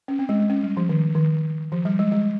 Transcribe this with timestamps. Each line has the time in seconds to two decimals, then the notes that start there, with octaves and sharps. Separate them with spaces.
0.08 C#4
0.19 C4
0.29 G#3
0.39 G#3
0.50 C#4
0.63 G3
0.77 F3
0.89 D#3
1.15 D#3
1.72 F3
1.85 G3
1.99 G#3
2.12 G#3